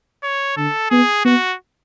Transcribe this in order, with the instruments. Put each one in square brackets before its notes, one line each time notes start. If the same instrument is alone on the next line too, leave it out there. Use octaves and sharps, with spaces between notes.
[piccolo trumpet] C#5
[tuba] D3 [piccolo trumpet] A4
[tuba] B3 [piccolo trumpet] G#4
[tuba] B3 [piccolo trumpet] F#4